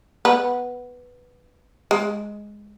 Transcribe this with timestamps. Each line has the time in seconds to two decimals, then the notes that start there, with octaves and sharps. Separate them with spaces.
0.25 B3
1.91 G#3